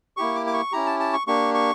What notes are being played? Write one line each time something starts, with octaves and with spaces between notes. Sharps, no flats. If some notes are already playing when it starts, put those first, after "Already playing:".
A#3 E4 G4 C#6
D6
D6
C#6
C#4 E4 G4 A#5
A5
A5
C#6
A#3 D4 G4 C#6
C#6